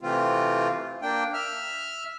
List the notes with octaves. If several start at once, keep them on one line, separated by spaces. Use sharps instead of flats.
C3 E3 A3 C4 F4
A#3 D4 G5
E5 F6